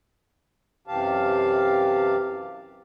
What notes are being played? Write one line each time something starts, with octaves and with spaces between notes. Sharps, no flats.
F#2 C3 E3 G4 F5 A5